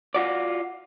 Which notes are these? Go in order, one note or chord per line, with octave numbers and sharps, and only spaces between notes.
F4 F#4 D5